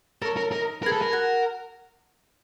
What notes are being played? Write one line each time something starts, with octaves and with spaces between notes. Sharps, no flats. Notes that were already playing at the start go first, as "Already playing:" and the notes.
A4 A#4 C#5
A#4
D#4 A#4
G#4 A#4 B4
A4
A#4
F#4